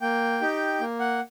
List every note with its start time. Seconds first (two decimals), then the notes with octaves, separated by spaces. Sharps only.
0.01 A#3 G5
0.41 D#4 G4
0.80 A#3
1.00 F#5